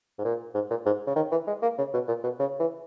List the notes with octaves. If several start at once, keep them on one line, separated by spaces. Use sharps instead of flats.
G#2
A#2
G#2
A#2
G#2
C#3
D#3
E3
G#3
A#3
C#3
B2
A#2
B2
C#3
E3